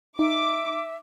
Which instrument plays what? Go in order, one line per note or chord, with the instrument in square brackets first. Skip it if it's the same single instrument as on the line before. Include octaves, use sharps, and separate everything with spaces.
[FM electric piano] D#4 [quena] E5 [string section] D6